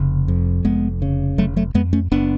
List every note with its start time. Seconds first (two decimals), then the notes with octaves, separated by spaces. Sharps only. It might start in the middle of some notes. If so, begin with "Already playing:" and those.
Already playing: F1 C#3
0.28 F2
0.65 F1 G#3 B3
1.02 C#3
1.38 F1 F#3 A3
1.56 F#3 A3
1.74 F2 G#3 B3
1.93 A3 C#4
2.12 F#1 B3 D4